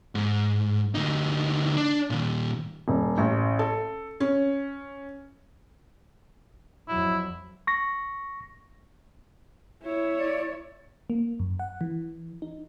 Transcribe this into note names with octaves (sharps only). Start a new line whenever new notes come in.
G#2
D2 D#4
D4
A#2 D#3
D#1
A1
A4
C#4
F2 F#3 E4
C#6 A#6
E4 C#5
D5
A#3
F#2
F#5
E3
D#4